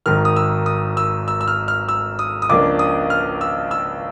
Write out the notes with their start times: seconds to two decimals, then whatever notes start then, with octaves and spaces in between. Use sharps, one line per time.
0.06 G#1 G#2 D#3 F6
0.25 D#6
0.36 E6
0.66 D#6
0.97 E6
1.28 E6
1.41 E6
1.48 F6
1.68 F6
1.88 E6
2.19 D#6
2.42 D#6
2.49 C#2 C#3 F3 A#3 D4 D6
2.79 D#6
3.10 F6
3.41 E6
3.71 E6